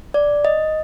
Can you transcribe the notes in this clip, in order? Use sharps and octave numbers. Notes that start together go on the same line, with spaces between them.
D5
D#5